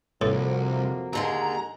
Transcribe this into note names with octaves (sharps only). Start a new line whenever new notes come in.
C2 F2 A2 F#3 A#3
D#2 D3 G#3 A#5